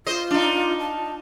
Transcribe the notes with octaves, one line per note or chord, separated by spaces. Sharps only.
F4 C5 D#5
D4 D#4
A5